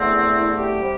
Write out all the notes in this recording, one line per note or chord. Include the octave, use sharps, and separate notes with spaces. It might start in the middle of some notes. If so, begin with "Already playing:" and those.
Already playing: E2 D3 A3 C4
E4
G4
C3 G3